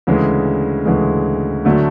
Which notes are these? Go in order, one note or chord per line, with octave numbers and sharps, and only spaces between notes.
D2 C#3 E3 G#3
D2 C#3 E3 G#3
D2 D3 F#3 A3